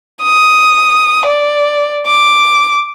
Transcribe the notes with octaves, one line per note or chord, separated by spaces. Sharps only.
D#6
D5
D6